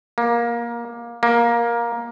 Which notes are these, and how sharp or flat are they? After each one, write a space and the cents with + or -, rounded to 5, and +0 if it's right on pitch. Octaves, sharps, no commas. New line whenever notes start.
A#3 +20
A#3 +15